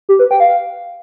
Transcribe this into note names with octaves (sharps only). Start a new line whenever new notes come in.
G4
B4
G5
F5